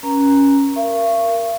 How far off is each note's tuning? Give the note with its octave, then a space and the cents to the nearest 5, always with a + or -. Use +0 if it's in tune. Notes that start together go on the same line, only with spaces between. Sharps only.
C#4 +0 A#4 +45 A#5 +0
A#4 +0 F5 -45 C#6 -5